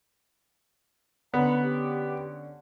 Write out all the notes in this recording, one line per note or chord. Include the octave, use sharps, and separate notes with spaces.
D3 B3 C#4 F#5 A#5 B5
G4